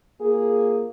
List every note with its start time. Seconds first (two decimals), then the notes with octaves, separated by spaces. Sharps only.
0.21 A#3 F4 G#4